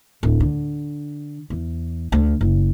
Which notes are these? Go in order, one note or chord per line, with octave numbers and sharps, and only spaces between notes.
D1
D3
E2
D2
F#1